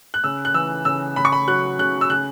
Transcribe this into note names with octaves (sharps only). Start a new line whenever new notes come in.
F#6
C#3 E6
F#6
E3 E6
C#3 E6
C#3 B5
C#6
B5
F#3 F#6
C#3 F#6
E6
C#3 F#6